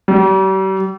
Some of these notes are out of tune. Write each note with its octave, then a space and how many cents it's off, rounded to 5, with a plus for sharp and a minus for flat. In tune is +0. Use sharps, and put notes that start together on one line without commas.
G3 -40